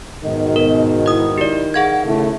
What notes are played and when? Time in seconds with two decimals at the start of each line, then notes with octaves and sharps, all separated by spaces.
0.24 G#2 B2 D#3 D#5
0.56 A#4
1.06 E4 D#5 D#6
1.38 E4 G4 D5
1.74 G#4 F5 F#5 G#6
2.06 C#3 A3 E4